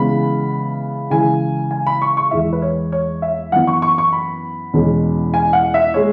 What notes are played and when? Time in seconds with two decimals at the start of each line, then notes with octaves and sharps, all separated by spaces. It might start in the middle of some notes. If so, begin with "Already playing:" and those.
Already playing: C#3 E3 G#3 B3 E4 B5
1.10 C#3 E3 G#3 E4 G#5
1.71 G#5
1.87 B5
2.02 C#6
2.17 C#6
2.31 E2 E3 G#3 E4 E5
2.53 B4
2.62 C#5
2.92 C#5
3.22 E5
3.52 F#2 E3 B3 F#5
3.67 C#6
3.82 C#6
3.98 C#6
4.13 B5
4.73 E2 B2 G#3 C#4
5.34 G#5
5.53 F#5
5.74 E5
5.94 G#3 C#5